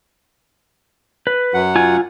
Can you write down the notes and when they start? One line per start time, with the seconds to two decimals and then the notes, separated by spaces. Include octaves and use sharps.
1.27 B4
1.54 F#2 F#3 F#5
1.75 F4 G#5